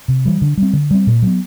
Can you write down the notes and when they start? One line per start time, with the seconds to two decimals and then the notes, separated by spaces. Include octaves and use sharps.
0.08 C3
0.25 E3 G3
0.42 D3
0.57 G3 C4
0.73 D3
0.91 G3 C4
1.07 A#2
1.22 F#3 B3